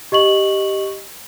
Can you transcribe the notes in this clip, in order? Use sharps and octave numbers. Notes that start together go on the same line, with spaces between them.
G4 D#5 C#6 F#7